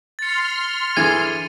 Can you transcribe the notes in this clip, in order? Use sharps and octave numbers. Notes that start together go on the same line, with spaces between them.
C6 F6 A6 C#7
D3 E3 G#4 G#6 D#7